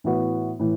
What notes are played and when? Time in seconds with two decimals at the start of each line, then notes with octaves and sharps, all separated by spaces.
0.04 A2 E3 B3 F#4 B4
0.59 A2 E3